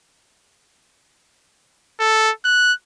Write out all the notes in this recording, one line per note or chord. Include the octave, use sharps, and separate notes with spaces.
A4
F#6